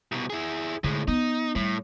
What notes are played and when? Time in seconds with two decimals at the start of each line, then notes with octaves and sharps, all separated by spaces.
0.12 C2 B2
0.30 E4 G#4
0.84 A2 D3 G#3
1.08 B3 D#4
1.55 A2 G3